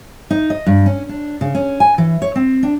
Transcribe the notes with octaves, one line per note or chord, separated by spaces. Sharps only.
D#4
D#5
G2
C#4
D4
C#3
C#4
G#5
E3
C#5
C4
D4